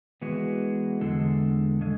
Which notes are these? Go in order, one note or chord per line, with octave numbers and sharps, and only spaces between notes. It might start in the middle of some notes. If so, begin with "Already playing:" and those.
E3 G#3 B3 F#4
E2 D3 G#3 D4 A4
C#3 G#3